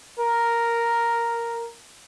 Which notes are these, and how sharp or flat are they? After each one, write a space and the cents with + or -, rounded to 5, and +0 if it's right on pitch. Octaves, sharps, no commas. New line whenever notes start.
A#4 +0